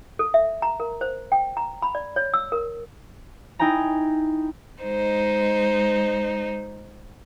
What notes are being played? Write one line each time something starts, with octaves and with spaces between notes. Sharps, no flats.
A4
E5
A#5
A#4
C5
G5
A#5
B5
D5
C#5
E6
A#4
D#4 E4 G5 G#5 A#5
G#3 D#4 C5